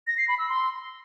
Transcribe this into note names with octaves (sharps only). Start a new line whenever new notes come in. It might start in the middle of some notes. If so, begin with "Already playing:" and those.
A#6
C7
B5
E6
C6